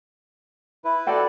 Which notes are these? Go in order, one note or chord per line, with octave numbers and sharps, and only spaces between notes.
E4 B4
F#4 A4 D5 G5